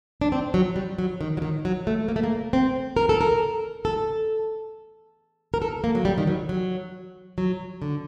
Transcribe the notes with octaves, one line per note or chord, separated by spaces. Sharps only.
D4
C4
F#3
G3
F#3
D#3
F#3
D#3
F#3
A3
A#3
A3
A#3
C4
A#4
A4
A#4
A4
A#4
A4
A#3
F#3
G3
D#3
F#3
F#3
F#3
D3